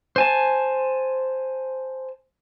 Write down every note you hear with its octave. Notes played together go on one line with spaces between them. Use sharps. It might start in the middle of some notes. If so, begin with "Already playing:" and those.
C5 G#5 A5